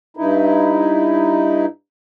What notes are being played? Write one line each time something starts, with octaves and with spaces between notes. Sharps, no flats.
G2 D#4 E4